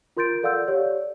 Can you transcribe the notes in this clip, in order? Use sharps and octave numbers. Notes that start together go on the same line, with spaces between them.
F4 A#4 C6 G6 A6 D7
A4 D5 F5 F#5 E6 G6
G4 C#5 D5